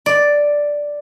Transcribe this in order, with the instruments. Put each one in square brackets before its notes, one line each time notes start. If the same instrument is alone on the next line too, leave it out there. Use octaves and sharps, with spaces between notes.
[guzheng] D5